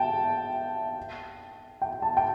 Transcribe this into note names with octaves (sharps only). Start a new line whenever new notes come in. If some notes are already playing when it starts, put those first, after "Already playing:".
Already playing: G5 A5
G5
A5
G5